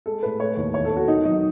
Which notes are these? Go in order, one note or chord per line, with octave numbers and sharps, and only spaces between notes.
G#3 A4
A2 B4
A3 C#5
D#2
E2 C#5
A4
E2
F#4
D#3 D#4
F#3 D#4